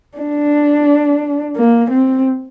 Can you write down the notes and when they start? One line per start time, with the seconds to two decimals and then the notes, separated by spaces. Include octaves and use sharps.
0.18 D4
1.57 A#3
1.91 C4